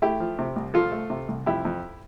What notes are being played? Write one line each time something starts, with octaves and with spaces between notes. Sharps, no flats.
A3 E4 G4
F3
C3
C2
F3 F4 A4
A3
C3
C2
F2 E4 G4
F2